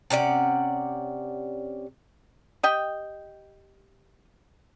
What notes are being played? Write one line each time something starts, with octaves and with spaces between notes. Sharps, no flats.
C3 C#4 D5 F#5
G4 D#5 G5